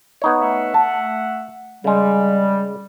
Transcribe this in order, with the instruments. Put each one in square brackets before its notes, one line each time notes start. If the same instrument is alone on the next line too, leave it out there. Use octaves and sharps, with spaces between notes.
[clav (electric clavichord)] B3 D#4 C#5
[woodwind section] A3 E5 F#5
[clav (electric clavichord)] A5
[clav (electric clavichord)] C#3 G#3 [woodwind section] G3